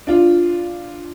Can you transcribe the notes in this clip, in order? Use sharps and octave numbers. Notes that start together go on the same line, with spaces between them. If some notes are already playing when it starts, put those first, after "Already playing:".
D4 F4